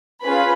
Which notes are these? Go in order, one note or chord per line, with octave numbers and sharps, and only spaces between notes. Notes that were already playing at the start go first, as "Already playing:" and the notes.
C#4 F4 G#4 B4 B5